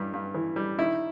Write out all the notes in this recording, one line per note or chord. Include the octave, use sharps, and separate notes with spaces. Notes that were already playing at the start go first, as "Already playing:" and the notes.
Already playing: G2 E3 G3
G2
E3
G3
D#3 E4